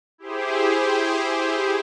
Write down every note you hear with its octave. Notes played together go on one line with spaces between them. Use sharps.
E4 G4 G#4 C5